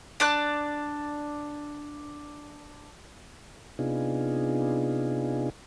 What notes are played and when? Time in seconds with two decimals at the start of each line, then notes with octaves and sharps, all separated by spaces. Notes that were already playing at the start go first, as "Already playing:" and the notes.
0.20 D4 D5 F#6
3.79 C3 B3 D4 D#4 F4 G#4